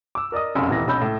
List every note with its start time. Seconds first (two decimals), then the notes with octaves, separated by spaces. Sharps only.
0.15 D6 E6
0.32 A#4 D5 D#5 D#6
0.55 F1 C2 F#2 C#3 F4 G#5
0.68 D#1 A1 C3 E3 A#6
0.87 B1 C#4 B5 E6 G6
1.02 A2